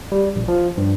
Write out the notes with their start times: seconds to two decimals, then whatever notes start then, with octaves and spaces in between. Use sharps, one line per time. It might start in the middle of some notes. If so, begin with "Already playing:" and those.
0.12 G3
0.36 A#1
0.48 F3
0.77 G2